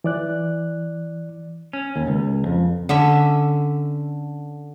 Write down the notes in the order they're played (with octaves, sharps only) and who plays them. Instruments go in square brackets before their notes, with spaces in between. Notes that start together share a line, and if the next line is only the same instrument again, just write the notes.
[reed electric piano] E3 D5 F#6
[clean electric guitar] C#4
D#2
C#2
F2
[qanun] D3 C#4 E5